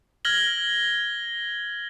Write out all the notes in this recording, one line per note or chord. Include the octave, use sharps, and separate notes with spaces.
F6 G#6 A#6 F#7 G7